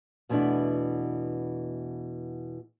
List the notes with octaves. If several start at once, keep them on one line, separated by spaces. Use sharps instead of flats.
E2 B2 E3 A3 D4 E4